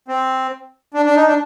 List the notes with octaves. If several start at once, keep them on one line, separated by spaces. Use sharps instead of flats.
C4
D4
D4
D#4
D4